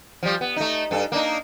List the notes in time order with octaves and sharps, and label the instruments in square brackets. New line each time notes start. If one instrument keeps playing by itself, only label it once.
[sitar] F3 G3
B3
A3 D#4
G2 A4
A#3 D4 D#4